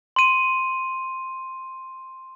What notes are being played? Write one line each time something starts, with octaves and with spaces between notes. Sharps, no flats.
C6 D#7